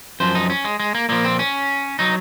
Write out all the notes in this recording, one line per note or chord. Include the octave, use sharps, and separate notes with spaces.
F#2 F3 C5
D#4
C#4
G#3
G#3
A#3
A#2 F3 A#3
C4
C#4
F#3 D#4